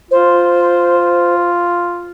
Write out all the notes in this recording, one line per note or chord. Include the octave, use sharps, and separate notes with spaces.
F4 C5